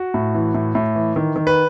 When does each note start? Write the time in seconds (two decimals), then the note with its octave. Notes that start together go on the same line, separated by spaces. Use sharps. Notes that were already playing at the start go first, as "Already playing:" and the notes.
Already playing: F#4
0.14 A2
0.34 E3
0.54 A2
0.75 A2
0.95 E3
1.16 D#3
1.36 D#3
1.47 B4